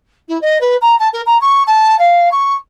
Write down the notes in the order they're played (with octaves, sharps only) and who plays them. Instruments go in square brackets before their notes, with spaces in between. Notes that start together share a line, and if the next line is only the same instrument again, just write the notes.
[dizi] E4
D#5
B4
A#5
A5
A#4
A#5
C#6
A5
F5
C#6